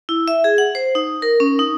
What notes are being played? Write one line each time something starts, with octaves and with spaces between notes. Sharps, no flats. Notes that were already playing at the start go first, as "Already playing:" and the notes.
E4
E5
G#4
F#5
C5
D#4
A#4
C#4
D#4